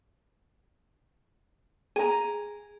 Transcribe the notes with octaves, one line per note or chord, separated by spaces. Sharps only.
G#4 G#5 A#5